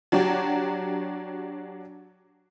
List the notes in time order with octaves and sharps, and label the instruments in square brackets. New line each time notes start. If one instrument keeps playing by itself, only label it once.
[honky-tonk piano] F#3 D4 F#4 G4